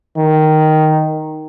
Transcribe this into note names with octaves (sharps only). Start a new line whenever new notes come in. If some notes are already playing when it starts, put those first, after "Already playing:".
D#3